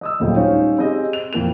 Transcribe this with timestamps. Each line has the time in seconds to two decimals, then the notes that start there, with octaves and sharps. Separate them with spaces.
0.01 D#5 D#6 E6
0.20 D#1 A#1 F#3 A3 F4 G5
0.36 G3 C#4 D#4 C5 C#5 F5
0.78 C4 G4 G#4 D#5
1.13 F7
1.33 F2 A#2 E3 A#4 F7